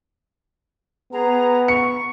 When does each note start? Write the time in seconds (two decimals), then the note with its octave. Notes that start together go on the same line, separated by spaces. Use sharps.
1.12 B3 G#4 A#5
1.68 C#6 C#7